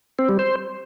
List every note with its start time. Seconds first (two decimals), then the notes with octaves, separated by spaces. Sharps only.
0.19 C4
0.29 G3
0.39 C5